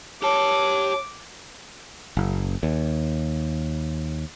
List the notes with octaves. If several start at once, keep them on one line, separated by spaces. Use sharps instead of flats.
G4 C#5 A5 D6
F#1
D#2